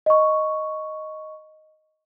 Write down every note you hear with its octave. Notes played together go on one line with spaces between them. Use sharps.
D#5 C#6